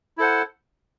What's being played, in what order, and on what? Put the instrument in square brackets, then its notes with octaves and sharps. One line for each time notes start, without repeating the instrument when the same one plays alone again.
[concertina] E4 A4 C5 F#5